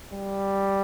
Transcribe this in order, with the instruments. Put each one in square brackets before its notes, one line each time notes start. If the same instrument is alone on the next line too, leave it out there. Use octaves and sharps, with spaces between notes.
[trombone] G3